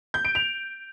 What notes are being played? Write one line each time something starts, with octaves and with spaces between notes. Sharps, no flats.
G6
D7
F7